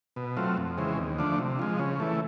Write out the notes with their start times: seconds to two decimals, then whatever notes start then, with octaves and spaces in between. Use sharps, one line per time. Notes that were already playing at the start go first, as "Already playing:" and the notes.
0.16 B2
0.37 F#3 A3 C4 F4
0.57 F2
0.77 C#3 E3 G#3 C4
0.99 D#2
1.18 D3 F3 A3 D4
1.39 C3
1.59 F3 G#3
1.79 C#3
2.00 E3 A3